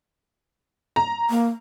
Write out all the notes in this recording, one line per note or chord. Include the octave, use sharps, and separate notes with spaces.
A#5
A#3